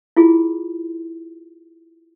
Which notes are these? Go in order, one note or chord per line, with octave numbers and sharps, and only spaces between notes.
E4 F4 G#4